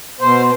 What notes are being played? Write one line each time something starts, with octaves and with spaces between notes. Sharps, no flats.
B2 C5